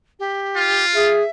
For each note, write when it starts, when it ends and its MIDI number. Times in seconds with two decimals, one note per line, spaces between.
0.19 0.85 67
0.56 1.14 65
0.94 1.23 68
0.94 1.30 76